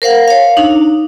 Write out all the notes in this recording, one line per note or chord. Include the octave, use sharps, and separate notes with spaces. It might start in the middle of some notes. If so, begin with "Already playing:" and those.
A#4 C5 F5 F#5
C#5 F5
D4 D#4